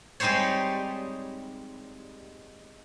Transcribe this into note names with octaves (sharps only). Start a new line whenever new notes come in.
G3 G#3 C4 D#4 C5 C#5